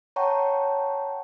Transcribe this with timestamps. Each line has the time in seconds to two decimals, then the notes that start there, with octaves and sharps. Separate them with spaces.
0.16 C#5 F#5 G5 A5 A#5 C#6